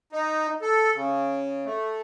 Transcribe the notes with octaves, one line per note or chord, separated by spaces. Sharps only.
D#4
A4
C#3
A3